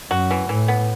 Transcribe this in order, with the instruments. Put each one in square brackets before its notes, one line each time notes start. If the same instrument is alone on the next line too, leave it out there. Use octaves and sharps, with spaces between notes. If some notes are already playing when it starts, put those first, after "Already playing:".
[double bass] F#2 [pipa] F#4
[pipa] E3
[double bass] A2 [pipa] E3
[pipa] B3